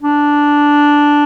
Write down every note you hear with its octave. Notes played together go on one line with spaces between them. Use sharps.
D4